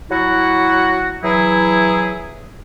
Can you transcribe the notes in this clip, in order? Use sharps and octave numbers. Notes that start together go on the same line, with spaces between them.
F#3 E4 F#4
E3 F#3 E4 G#4